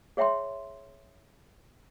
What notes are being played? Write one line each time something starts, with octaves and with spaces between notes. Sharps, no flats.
G#4 C#5 E5 G5 A#5 C6